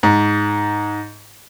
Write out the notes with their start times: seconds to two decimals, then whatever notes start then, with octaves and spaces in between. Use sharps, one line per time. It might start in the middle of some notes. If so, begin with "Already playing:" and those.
0.03 G#2